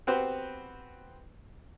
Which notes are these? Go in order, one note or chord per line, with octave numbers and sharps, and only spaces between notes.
B3 C4 F#4 G4 B4 C5